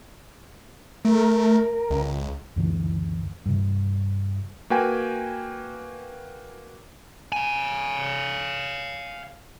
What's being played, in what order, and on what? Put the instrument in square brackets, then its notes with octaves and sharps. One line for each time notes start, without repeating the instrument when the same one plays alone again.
[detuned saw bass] A3 [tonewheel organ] A#4
[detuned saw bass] C#2
[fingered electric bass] C#2 F#2 D3 E3
G2 C3
[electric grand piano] A#3 F#4 B4 G5 G#5
[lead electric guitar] F5 G#5